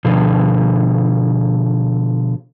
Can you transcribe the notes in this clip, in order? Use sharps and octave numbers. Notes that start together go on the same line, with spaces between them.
B2 D3 F3